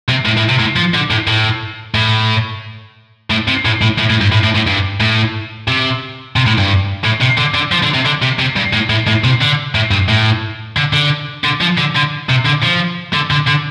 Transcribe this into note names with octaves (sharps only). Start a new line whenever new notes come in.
C3
A2
A2
C3
A2
F3
D3
A2
A2
A2
A2
C3
A2
A2
A2
A2
G2
A2
A2
A2
G2
A2
C3
C3
A2
G2
A2
C3
D3
D3
F3
D3
C3
D3
C3
C3
G2
A2
A2
A2
C3
D3
A2
G2
A2
D3
D3
D3
F3
D3
D3
C3
D3
F3
D3
D3
D3